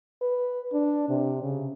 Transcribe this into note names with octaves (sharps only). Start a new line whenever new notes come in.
B4
D4
C3
C#3